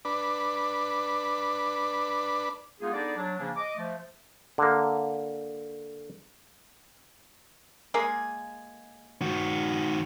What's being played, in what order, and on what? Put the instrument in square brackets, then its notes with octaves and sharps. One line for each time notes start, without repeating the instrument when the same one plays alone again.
[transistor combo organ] D4 B4
[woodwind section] G#3 A#3 B3 D#4 F4 G#4
B3 D4 D#4 G#4 A4 D5
F#3 D4
C#3 F3 A#3 C#4 D4
D#5 D6
F3 A3
[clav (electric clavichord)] D3 A#3
[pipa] G#3 A#3 G#4
[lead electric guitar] D#3 F#4